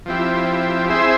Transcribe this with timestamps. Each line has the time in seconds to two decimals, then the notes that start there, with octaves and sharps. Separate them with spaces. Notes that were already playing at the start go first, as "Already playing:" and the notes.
0.06 F3 C4 E4 G4
0.89 C4 E4 G#4 C5 E5